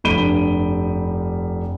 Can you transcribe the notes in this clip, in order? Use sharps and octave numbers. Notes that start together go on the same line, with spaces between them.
F1 G2 B5 D7 D#7 G7